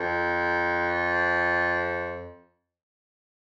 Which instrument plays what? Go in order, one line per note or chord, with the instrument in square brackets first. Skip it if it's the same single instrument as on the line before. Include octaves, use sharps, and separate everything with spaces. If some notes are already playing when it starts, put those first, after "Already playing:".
Already playing: [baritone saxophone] F2